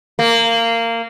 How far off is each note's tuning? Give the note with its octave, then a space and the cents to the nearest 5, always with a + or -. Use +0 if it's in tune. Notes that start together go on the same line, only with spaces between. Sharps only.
A#3 -20